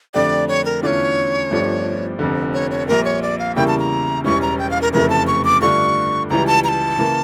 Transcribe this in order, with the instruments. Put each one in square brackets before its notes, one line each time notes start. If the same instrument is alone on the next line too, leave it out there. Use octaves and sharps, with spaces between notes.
[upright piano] F2 D3 A3 D4 G4 [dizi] D5
[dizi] C#5
A#4
[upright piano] E2 D3 A3 C#4 F4 [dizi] C#5 D5
[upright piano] G1 G2 F3 A3 D4
F1 F2 D3
[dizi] C#5
C#5
[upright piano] A#1 A#2 G3 [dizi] A#4
[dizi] C#5
D5
F5
[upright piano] E2 C#3 G3 A#3 E4 [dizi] G5
[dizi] A5
A#5
[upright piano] E1 E2 E3 G3 C#4 [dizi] C#6
[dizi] A#5
G5
F5
A#4
[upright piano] F1 F2 C#3 E3 A3 [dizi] A#4
[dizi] A5
C#6
D6
[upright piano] G2 D3 A3 D4 F4 [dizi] C#6
[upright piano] C#2 C#3 E3 G3 [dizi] A#5
[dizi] A5
A#5
A5
[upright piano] C#3 E3 A#3